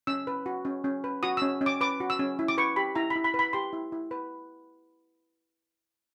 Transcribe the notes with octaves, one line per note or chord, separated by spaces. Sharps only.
C#4 E6
B4
F#4
C#4
C#4
B4
F#4 D#6
C#4 E6
C#4
D6
B4 D6
F#4
E6
C#4
E4
D6
B4 C#6
G4 B5
E4 A#5
B5
E4
B5
B4
B5
G4 C6
E4
E4
B4